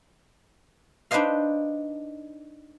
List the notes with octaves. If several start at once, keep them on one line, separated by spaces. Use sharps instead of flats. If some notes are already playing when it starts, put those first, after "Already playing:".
D4 D#4 B4 C5 D#5 F5